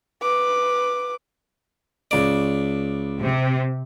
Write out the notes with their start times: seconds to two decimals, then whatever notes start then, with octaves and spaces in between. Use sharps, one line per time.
0.22 B4 D6
2.11 C#2 D5
3.20 C3